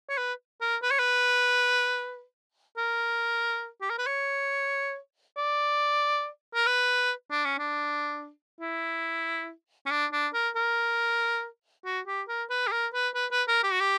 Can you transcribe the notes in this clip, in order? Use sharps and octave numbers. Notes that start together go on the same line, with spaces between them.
C#5
B4
A#4
B4
C#5
B4
A#4
G4
A#4
B4
C#5
D5
A#4
B4
D4
C#4
D4
E4
C#4
D4
D4
A#4
A#4
F#4
G4
A#4
B4
G4
A#4
B4
B4
B4
A#4
G4
F#4
G4